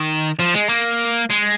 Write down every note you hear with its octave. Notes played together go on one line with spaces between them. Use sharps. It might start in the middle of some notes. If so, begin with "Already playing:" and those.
Already playing: D#3
F3
G#3
A#3
G#3